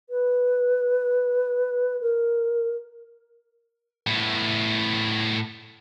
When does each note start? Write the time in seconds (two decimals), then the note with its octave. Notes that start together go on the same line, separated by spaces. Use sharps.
0.09 B4
2.01 A#4
4.07 A2 B3